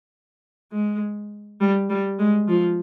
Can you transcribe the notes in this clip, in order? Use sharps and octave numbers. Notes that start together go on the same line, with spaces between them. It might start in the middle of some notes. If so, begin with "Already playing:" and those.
G#3
G3
G3
G#3
F3